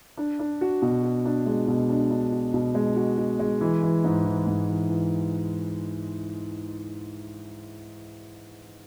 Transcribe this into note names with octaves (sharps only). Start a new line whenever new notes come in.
D4
D4
F#4
B2
F#4
D4
G#3
B2
D4
D4
F#4
B2
G#3
F#4
F#4
G#3
E3
E3
G#2
E3
G#2
E3
E3